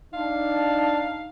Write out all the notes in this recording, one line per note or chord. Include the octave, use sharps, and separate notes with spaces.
D4 D#4 F5